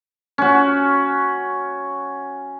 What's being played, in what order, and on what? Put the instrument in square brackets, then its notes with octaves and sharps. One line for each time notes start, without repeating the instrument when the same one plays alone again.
[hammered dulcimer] C#4 F#4